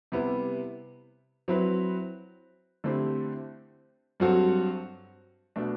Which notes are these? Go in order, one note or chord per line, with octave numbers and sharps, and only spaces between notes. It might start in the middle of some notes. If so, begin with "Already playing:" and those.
C3 G3 B3 E4
F#3 C4 E4 B4
D3 A3 C4 E4 G4
G2 F#3 C4 F#4 A4
B2 A3 D4